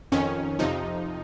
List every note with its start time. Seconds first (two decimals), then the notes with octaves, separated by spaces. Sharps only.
0.12 F2 D#3 C#4
0.59 F2 C3 F3 D#4